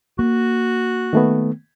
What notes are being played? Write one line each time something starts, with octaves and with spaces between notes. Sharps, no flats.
A#3 F#4
D#3 A3 B3